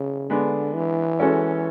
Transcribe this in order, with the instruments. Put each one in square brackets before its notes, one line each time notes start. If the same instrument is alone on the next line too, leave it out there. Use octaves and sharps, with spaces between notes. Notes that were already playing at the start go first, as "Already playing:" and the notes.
Already playing: [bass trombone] C#3
[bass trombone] D3 [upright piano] G#3 B3 D4
[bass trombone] E3
[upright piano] G#3 C#4 F#4 A4 C#5